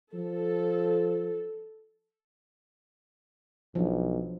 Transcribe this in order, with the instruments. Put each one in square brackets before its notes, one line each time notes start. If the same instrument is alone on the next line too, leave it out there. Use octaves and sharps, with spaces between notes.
[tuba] F3 [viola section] A4
[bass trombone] B1 [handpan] F3 D4